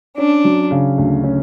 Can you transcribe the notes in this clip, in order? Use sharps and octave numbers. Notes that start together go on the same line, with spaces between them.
C#4 D4
F#3
C#3
D2
C#4